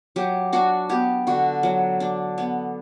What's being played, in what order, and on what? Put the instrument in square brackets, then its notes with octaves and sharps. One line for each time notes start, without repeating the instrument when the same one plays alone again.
[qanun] F#3 G4
D4 F#4
B3 G4
D3 F#4
F#3
D4
B3